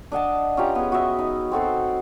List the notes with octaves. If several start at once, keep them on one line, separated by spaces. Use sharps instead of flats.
D4 D#5 F#5 A5
C#4 F4 G4 A#5
B3 G#4
F#4 D#5 E5 C#6
D#4
C4 F#4 A4 C5